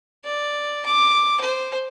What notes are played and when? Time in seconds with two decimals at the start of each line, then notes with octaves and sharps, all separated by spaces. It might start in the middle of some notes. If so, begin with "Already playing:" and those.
0.24 D5
0.86 D6
1.40 C5